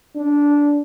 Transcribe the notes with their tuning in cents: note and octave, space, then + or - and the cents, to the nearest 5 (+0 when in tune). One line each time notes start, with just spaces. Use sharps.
D4 -15